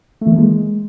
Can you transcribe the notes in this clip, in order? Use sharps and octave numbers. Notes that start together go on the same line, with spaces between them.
A3
E3
A#3
G#3